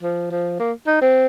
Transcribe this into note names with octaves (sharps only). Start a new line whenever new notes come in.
F3
F3
A#3
D#4
C4